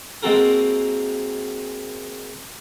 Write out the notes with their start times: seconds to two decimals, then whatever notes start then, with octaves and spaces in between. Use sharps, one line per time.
0.23 G#3 A#3 C4 F#4 A4 A#4